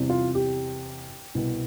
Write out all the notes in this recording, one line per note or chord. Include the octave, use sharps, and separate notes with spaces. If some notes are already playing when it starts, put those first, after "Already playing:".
Already playing: E2 C3 G3
F4
G4
C2 B2 B3